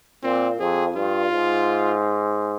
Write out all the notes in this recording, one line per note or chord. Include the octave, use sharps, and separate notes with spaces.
A#2 C4
F2 G#4
G2 F4
G#2